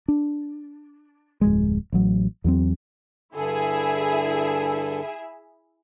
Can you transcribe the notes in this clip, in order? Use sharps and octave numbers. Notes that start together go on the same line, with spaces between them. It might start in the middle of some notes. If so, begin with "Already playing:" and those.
D4
D1 F2 G#3
A1 F#3
E2 F#3 C4
G2 D3 E4 G#4 A4 E5